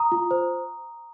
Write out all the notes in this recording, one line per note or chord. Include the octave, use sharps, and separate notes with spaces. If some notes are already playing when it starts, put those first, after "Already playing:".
Already playing: A#5 D#6
F4
C5